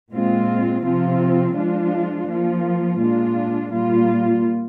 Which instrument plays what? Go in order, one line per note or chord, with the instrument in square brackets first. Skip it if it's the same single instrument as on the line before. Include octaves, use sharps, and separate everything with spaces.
[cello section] A#2 G#3 C4 F4
C3 F3 C4 F4
F3 G#3 D4 F4
F3 A#3 F4
A#2 G#3 D4 F4
A#2 G3 A#3 F4